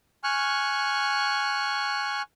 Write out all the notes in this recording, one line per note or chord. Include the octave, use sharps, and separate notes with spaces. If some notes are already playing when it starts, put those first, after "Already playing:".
G#5 C#6 F6 F#6